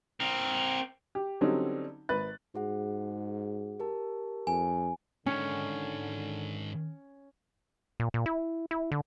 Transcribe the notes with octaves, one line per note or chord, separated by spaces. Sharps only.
C4 A#4
G4
D3 F#3 G3 C4 C#4 D#4
G#1 B4 F#6 A6
G#2 F#4 G#4 F#5
G4 A#4 A5
F2 G#5
G#2 D3 D#3 C#4
A#2
A#2
E4
E4
D3